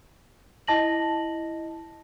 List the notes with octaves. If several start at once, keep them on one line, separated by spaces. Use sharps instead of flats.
E4 D#5 A5 A#6 F#7